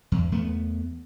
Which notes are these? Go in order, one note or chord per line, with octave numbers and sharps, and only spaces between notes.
E2
E2 A3 B3